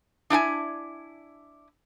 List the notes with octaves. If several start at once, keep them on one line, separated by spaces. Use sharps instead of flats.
D4 E4 G5 G#5